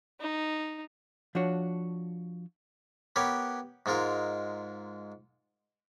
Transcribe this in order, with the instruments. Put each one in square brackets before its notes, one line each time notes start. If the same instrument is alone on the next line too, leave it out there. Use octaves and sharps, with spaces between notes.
[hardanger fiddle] D#4
[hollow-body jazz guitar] F3 D4 F#4 C#5
[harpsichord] B3 G4 A#4 B4 C#5
G#2 G#3 F4 A#4